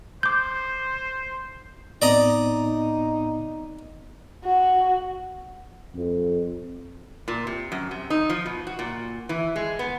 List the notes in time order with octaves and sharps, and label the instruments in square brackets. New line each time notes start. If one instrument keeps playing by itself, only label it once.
[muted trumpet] C5 [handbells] D6 G6
[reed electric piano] A2 B3 C4 [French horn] D#4 [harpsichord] D5 D#5 A#5
[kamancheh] F#4
[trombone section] F2
[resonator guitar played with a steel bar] A#2
C3
F#2
C3
D#4
F3
B2
F#4
A#2
E3
G#3
B3